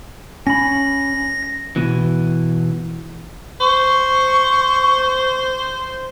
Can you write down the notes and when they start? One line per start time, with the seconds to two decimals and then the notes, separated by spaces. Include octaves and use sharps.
0.47 C#4 B5 A#6
1.76 E2 G#2 B2 E3
3.61 C5 C#6